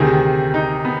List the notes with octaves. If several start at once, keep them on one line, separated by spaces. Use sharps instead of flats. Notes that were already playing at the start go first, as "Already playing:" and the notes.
Already playing: D2 C3 D#3 G#4
D#4
B3